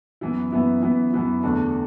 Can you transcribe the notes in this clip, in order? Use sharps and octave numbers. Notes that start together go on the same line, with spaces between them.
F#2 E3 B3 E4
F#2 E3 B3 E4
F#2 E3 B3 E4
F#2 E3 B3 E4
E2 D3 A3 D4